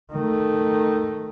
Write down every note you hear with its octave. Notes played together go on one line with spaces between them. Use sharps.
D#3 A3